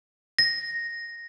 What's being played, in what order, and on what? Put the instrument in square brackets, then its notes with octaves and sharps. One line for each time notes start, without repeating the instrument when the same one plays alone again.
[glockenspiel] A#6